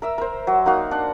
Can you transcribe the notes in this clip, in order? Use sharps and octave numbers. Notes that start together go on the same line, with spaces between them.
A#4 E5 E6
A#4 C5
F#3
A#3 D#4 F#4 F5
D4 F#5